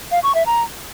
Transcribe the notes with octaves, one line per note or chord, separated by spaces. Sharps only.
F5
C#6
E5
A#5